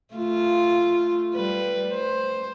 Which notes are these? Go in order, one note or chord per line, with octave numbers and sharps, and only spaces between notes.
A3 F4
G3 B4
C5